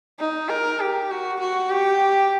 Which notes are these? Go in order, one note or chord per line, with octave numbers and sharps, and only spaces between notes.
D#4
A#4
G4
F#4
F#4
G4